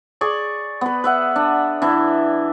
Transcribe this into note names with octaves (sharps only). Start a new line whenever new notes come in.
G#4 D5 C#6
B3 B4
B4 E5 F#5
D4
E3 D4 E4